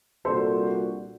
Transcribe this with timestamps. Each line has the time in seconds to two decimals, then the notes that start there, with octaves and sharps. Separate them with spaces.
0.25 C2 A#2 G3 D4 F#4 A4 C5